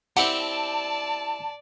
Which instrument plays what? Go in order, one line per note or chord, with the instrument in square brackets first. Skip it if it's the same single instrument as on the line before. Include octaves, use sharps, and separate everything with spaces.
[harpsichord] C4 E4 G4 [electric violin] D5 [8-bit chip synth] F#5 [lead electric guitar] A5